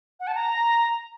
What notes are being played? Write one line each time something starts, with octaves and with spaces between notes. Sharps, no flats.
F#5
A5
A#5